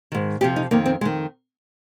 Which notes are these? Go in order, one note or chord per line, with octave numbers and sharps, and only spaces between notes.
G#2 D#3
F2 C3 F3 G4
D#4
F2 D#3 A#3
C4
F2 D#3 G#3